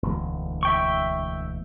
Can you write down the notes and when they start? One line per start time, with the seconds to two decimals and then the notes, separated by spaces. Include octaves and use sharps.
0.03 E1 D2
0.63 E5 G5 C#6